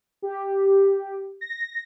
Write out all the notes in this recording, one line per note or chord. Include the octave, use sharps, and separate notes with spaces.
G4
A#6